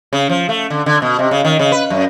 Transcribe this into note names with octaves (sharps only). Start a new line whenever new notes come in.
C#3
F3
A3
D3
D3
B2
C3
C#3
D#3
C#3
B4
F#2